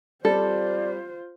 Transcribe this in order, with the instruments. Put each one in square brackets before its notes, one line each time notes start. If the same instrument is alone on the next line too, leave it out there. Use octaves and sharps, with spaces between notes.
[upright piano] G3 C4 [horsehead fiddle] F4 C5 [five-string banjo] A4 [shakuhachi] D5